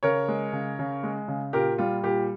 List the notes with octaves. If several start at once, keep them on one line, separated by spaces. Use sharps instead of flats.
C#3 A#4 C#5
G#3
C#3
C#3
G#3
C#3
A#2 G4 A#4
G3 F4
A#2 G4